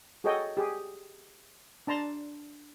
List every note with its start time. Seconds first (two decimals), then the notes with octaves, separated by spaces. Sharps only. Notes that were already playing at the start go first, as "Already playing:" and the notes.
0.24 F#4 G#4 A4 C#5 D#5 G5
0.57 G4 G#4
1.87 D4 A5 A#5 C6